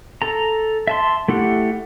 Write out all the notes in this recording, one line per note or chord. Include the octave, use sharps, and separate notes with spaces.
A4 A#5
E5 A5 C6
A3 E4 G4 F#5